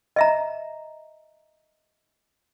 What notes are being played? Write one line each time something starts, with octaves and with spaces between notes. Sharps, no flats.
D#5 E5 A#5